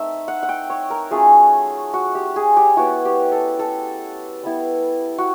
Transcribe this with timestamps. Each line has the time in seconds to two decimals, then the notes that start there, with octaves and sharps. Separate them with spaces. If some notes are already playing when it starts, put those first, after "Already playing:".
Already playing: A3 C4 D#4 E5
0.28 F#5
0.43 F#5
0.49 G5
0.70 C#5
0.90 A#4
1.11 F#3 A3 C#4 F4 G#4
1.93 F#4
2.15 G4
2.36 G#4
2.57 G4
2.76 F#3 B3 E4 F#4
3.05 G4
3.32 A4
3.59 A4
4.43 G3 B3 E4
5.18 F#4